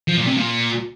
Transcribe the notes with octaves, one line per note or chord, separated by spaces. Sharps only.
F3
A#2
C3
A#2